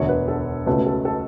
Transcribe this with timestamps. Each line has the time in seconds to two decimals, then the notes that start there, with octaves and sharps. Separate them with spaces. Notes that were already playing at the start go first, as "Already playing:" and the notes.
Already playing: E1 D2 D3 C#5
0.09 B4
0.28 A4
0.66 C#2 B2 A3 C#4 B4
0.86 A4
1.05 A4